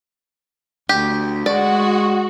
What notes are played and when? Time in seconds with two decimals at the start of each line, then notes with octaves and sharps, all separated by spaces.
0.89 D2 G4
1.46 G#3 F#4 D5